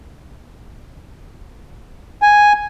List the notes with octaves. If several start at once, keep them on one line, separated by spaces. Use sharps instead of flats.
G#5